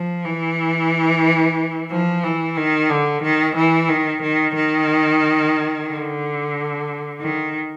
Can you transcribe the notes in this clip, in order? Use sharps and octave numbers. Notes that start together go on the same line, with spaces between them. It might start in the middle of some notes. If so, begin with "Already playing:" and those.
Already playing: F3
E3
F3
E3
D#3
D3
D#3
E3
D#3
D#3
D#3
D3
D#3